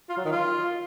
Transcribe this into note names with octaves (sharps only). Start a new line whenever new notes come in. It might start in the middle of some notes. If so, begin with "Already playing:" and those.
F4
F#3
D#3
F4